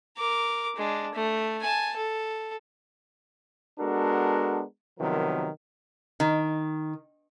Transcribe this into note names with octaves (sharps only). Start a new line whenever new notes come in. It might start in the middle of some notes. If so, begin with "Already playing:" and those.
A#4 D6
G#3 D4
A3
G#5 A5
A4
G#3 B3 D4 F#4 A4 A#4
C3 D#3 F3 F#3 B3 A#4
D#3